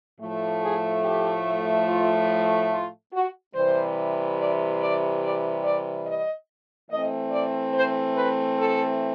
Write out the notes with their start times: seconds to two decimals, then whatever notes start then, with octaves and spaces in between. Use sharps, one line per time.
0.20 A2 F3 A3
0.62 G#4
1.04 G4
1.87 F4
2.71 F4
3.13 F#4
3.55 C3 E3 G3 C5
4.39 D5
4.81 D5
5.22 D5
5.64 D5
6.06 D#5
6.90 E3 A3 C4 D#5
7.32 D5
7.74 C5
8.16 B4
8.57 A4